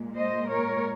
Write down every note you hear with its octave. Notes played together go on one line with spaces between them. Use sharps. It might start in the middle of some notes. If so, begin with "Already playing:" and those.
Already playing: A#2 G#3
C5 D#5
A#4 C#5